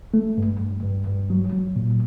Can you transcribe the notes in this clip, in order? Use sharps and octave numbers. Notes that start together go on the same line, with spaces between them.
A3
G2
G2
G2
G2
F#3
F#3
A#2